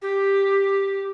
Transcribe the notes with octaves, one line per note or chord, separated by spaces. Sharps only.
G4